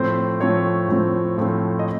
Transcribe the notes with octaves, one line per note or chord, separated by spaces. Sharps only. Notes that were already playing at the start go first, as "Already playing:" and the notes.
Already playing: A2 F3 A3 C4 C5
A2 F3 A3 C4 C#5
A2 F3 A3 C4
A2 F3 A3 C4
D#5